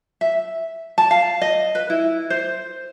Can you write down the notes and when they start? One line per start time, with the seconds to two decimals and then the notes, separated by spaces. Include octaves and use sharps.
0.21 E5
0.98 A5
1.11 F5
1.42 D#5
1.75 B4
1.90 E4
2.30 C5